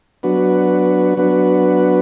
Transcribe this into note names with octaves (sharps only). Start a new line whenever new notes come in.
F#3 B3 D4 F#4 B4
F#3 B3 D4 F#4 B4